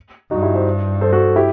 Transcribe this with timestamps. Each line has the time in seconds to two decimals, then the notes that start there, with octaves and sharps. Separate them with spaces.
0.31 G2 D#4 F#4
0.42 E4 G4
0.54 C5 E5
1.01 A4 C5
1.13 F#4 A4
1.36 E4 G4